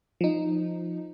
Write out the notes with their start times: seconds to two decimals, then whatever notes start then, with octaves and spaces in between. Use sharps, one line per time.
0.21 F3 D#4